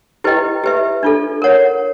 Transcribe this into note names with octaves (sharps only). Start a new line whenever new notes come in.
E4 G4 B4 D#5 G5
G4 B4 E5
D4 F4 A4
A#4 C#5 F#5